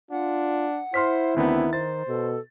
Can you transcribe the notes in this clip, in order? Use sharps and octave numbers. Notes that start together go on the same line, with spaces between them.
D4 F4 F#5
E4 C5 C6 F6 B6
D2 D#3 B3 C4 D4
C5 A6
B2 A4